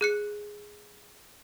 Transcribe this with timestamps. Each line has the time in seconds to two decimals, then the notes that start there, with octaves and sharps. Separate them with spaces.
0.01 G#4 F#6 C#7